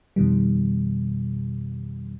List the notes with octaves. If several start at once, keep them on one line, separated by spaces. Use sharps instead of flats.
F2 B2 D#3 G3